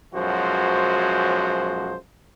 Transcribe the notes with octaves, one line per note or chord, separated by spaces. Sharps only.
B1 F#2 F3 G#3 F#4 C5